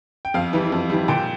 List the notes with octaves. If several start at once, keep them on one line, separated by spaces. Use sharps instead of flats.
G5
F2 F5
E3 G3
F2
E3 G3
A#2 G5